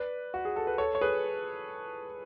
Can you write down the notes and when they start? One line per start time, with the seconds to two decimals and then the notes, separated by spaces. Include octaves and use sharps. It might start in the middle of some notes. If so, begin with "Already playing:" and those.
Already playing: B4 D5
0.34 F#4
0.45 G#4
0.56 A4
0.67 B4
0.78 A4 C#5
0.95 C#5
1.01 G#4 B4